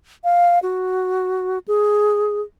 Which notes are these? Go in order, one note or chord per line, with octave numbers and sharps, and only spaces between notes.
F5
F#4
G#4